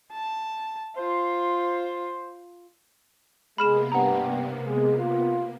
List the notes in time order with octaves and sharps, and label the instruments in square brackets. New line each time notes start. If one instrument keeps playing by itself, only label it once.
[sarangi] A5
[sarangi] F4 [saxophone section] C5
[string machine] C3 A#3 B3 [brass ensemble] G#3 [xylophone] B5 F6 E7
[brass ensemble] G2 [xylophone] F#5 A#5
[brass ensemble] G#3
F4